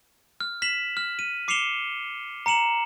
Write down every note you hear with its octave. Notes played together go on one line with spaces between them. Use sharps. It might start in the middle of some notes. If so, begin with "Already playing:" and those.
F6
B6 E7 F#7
F6
D#7
D6 C7 C#7 E7 F7 G7
A#5 C#7 E7 F#7